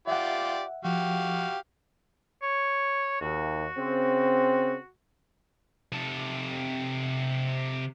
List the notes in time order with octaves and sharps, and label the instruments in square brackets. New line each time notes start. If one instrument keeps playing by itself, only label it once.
[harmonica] F4 G4 D5 [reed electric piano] E5 F#5
[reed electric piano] F3 [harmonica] F#4 G4 F5
[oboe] C#5
[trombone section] D#2 [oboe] F#4
[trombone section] C#3 C4
[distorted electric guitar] C3 A4